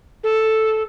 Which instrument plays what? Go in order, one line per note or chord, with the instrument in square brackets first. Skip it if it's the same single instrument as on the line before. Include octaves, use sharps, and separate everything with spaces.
[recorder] A4